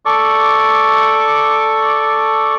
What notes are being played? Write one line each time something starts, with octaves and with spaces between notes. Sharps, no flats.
A4 D5 C#6 D6